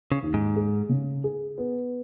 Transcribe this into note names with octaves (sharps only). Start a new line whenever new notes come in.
C#3
D#2
G#2
G#4
C#3
G#4
B3